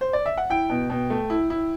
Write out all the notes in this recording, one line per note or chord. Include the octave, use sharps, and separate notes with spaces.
C5
D5
E5
F#5
E4 G5
B2
B2
A3
E4
E4